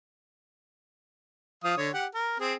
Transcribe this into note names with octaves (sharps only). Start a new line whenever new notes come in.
F3 F5 D#6
D3 C#5
G4 F#5
A#4
C4 G#4